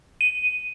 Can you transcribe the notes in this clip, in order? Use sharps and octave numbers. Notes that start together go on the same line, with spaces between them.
D#7